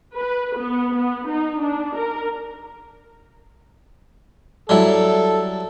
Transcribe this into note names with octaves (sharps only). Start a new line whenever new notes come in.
B4
B3
B3
D#4
D4
A#4
F#3 G3 E4 A4